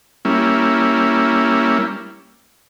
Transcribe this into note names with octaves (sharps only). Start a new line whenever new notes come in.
G3 A#3 C#4 E4